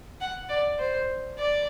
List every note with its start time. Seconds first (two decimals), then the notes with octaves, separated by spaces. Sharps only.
0.20 F#5
0.49 D5
0.79 C5
1.38 D5